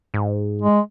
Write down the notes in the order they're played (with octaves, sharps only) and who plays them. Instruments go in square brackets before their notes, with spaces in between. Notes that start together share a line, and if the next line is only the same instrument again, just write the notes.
[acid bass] G#2
[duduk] G#3